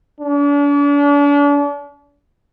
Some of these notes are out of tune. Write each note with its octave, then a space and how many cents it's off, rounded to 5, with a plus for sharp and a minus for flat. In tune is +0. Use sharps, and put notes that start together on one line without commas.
D4 -40